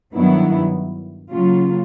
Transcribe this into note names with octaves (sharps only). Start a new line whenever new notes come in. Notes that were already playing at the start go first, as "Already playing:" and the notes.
G2 D#3 F#3 B3 E4
C#3 F#3 A#3 C#4 F4